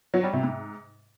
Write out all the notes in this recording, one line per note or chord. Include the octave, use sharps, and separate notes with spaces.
F#3
G3
C3
G#2